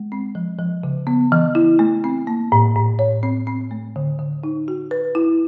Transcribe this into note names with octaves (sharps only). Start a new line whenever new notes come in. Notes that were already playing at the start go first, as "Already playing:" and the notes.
Already playing: G#3
C4
F3
F3
C#3
B3
E3
E4
A3
C4
A#3
A2
A2
C#5
C4
C4
A3
D3
D3
D#4
F#4
B4
E4